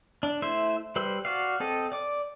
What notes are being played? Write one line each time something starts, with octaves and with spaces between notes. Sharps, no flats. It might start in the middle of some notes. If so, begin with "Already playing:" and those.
D4
A3 E4 C5 E5
G3 B4 C5 E6
F#4 D5 F5
C4 A4 D#5
D5 D6